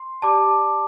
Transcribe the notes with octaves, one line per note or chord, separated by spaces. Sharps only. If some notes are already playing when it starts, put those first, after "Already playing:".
Already playing: C6
G4 D5 A5 D6